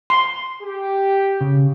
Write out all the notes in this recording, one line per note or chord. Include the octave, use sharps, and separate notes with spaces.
C6
G4
C#3